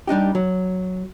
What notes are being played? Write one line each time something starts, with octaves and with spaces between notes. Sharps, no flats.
G3 D4 D#4 G4
F#3